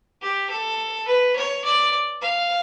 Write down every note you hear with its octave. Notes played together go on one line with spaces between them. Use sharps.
G4
A4
B4
C#5
D5
F5